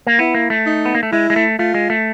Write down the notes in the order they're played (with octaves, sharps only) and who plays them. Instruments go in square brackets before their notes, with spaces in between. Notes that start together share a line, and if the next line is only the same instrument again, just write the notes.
[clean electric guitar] A#3
[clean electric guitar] B3 [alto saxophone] E4
[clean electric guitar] A#3
A3
[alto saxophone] D#4
[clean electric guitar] B3
A#3
A3
[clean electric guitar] G#3 [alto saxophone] E4
[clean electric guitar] G#3
A3
[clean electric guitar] A3 [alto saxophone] F4
[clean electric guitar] G#3
A3